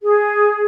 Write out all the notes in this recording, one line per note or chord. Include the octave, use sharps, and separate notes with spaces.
G#4